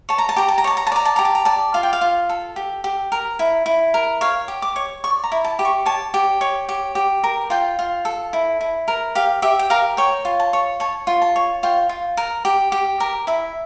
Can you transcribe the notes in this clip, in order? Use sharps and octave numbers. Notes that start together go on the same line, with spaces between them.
C#5 A5
A#5
A5
G4 A#5
A5
A#5
C#5 A5
A#5
A5
D5 A#5
A5
G4 A#5
A5
A#5
D5 A5
F4 F5
G5
F5
F4
A4
G4
G4
A#4
E4
E4
A#4
C#5 F5
G4
D6
C#5
D5 C#6
A#5
E4
A5
G4
C#6
C#5 A5
G4
C#5
G4
G4
A#4
F4 G5
F4
A4
E4
E4
A#4
G4 F5
G4 E5
G5
A#4 F5
C#5 G5
F4
A5
C#5
C#5 A5
F4
A5
C#5
F4 G5
F4
A#4
G4
G4
A#4
E4 E5